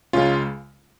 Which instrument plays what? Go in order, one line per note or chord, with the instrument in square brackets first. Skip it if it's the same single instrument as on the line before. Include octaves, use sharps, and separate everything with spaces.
[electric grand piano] C#2 C#3 G#3 C#4 F4